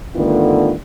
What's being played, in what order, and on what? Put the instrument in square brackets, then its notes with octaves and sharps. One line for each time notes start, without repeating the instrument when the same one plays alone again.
[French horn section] G2 D3 D#3 A3 B3 F4